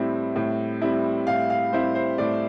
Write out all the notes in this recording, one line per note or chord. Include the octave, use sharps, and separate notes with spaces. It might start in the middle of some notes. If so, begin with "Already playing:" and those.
Already playing: A2 G3 C4 E4
A2
G3 C4 E4
A2 F5
F5
G3 C4 E4 C5
C5
A2 D5